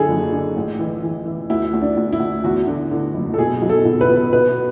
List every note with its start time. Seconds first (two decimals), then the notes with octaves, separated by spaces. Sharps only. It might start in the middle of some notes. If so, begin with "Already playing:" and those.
Already playing: F#2 D3 G#4 A4
0.09 F#1
0.32 D3
0.56 A1
0.79 E3
1.03 E3
1.26 E3
1.50 D2 E4
1.73 D2
1.81 D4
1.97 D2
2.13 E4
2.20 D2
2.44 E2 F#4
2.67 D3
2.91 D3
3.14 F#1
3.34 A4
3.38 B2 G#4
3.62 B1
3.69 A4
3.85 B2
4.01 B4
4.09 B2
4.32 B2 B4